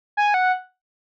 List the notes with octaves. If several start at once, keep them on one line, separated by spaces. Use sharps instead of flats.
G#5
F#5